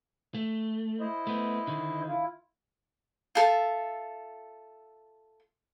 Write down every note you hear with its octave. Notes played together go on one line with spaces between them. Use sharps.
A3
E4 C5 D#5
A3 B3
D3 D#3
E4 F4
F4 A4 E5